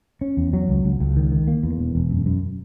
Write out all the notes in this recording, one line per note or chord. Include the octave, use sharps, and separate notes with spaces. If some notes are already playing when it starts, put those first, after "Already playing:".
C#4
E2
F#3
C#2
C#2
C#2
D#3
D#3
A#3
E2
E1
E1
F#2
F#2